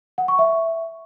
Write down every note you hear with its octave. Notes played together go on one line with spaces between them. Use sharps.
F#5
C#6
E5